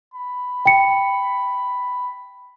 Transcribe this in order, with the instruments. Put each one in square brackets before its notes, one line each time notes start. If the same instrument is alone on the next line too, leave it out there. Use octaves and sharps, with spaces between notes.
[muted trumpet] B5
[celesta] G5 C#7